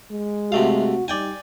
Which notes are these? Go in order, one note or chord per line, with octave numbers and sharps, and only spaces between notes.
G#3
C3 A3 F#4 F5
G3 D#4 D5 G5 G#5